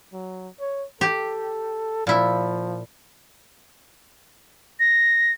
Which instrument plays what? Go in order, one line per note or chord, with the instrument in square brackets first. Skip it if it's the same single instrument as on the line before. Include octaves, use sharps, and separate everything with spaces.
[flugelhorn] F#3
C#5
[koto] G4 [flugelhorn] A4
[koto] A#2 E4 [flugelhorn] F3
[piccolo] A#6